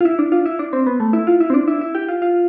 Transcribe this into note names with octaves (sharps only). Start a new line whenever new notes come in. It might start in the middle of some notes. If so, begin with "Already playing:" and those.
F4
E4
D4
F4
E4
D4
C4
B3
A3
E4
F4
E4
C4
D4
E4
E4
G4
F4
F4